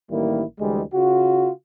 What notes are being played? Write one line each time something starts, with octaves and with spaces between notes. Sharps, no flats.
A1 D#3 G3 A#3 E4
D2 E3 G3 G#3
C#3 F4 F#4